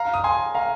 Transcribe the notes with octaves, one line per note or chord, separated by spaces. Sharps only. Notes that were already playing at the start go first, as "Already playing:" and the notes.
Already playing: F5 A#5
D#6
G#5 C6
F5 A#5